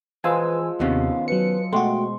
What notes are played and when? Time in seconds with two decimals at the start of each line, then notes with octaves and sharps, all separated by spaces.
0.24 E3 F3 G#3 G#4 B4 F5 G#5 E6
0.80 D#2 C3 D#3 B3 C#4 F5
1.28 F#3 B4 C#7
1.73 B2 G#3 A3 F#4 G5 C6 C#6